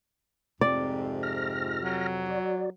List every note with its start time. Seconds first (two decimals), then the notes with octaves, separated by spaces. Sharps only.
0.61 F2 G#2 C3 D5
1.23 F6 A#6
1.82 F#3
2.26 F#4 D5